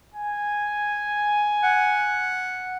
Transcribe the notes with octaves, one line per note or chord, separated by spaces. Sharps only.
G#5
F#5